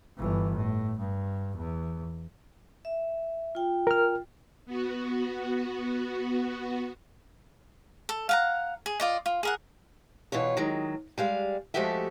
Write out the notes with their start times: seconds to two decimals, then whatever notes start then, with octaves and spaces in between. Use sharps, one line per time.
0.18 G1 E3
0.55 A2
0.99 G2
1.57 E2
2.85 E5
3.55 F4 G5
3.87 A#4 F6
4.66 B3 F#4
8.09 A4
8.29 F5 F#5 A#5
8.86 G#4
9.00 F4 D5 D#5
9.26 F4
9.43 G#4 A#4 F#5
10.32 B2 E3 F4 C#5
10.57 D#3 F#3 G#3
11.18 G3 G#3 F5
11.74 F3 G#3 A3 F#4 G4 E5